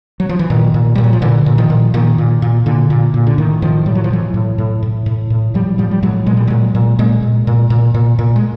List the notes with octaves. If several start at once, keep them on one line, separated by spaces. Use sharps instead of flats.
F#3
F3
E3
A#2 D#3
A#2
A#2 G3
F#3
F3
A#2 D3 E3
A#2
D#3 F3
A#2
A#2 D#3
A#2
A#2
A#2 D3
A#2
A#2
D3
A2 D#3
A2 D#3 F3
A2 G3
F#3
F3
A2 E3 F#3
A2
A2
A2
A2
A2
A2 F3 G3
A2 F3 G3
G3
A2 F#3 G#3
A#2 G#3
G3
A#2 F#3 G#3
A#2
A#2 G#3 A#3
A#2
A#2
A#2
A#2
A#2
G#3